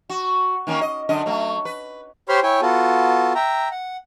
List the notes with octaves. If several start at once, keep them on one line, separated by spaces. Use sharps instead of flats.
F#4
D#3 A#3 C#4
D#5
F#2 D3 D#5
F#3 A3
B4
G4 C5 C#5 B5 C6 F6
E4 C#5 G5 G#5
B3 F4 F#4 A4
E5 G5 A#5
F#5